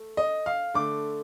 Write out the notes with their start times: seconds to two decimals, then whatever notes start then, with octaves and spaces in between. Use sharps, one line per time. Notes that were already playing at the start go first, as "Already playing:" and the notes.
Already playing: A3
0.17 D#5
0.46 F5
0.74 D3 A3 D6